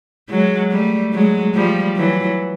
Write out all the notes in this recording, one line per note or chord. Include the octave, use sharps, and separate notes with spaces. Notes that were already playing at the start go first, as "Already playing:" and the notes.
F#3 G#3
G3 A3
F#3 G#3
F3 G3
E3 F#3